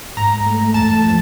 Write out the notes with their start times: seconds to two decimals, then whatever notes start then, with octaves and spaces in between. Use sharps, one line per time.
0.17 G#2 A#5
0.46 A3
0.74 E2 A5
1.03 F3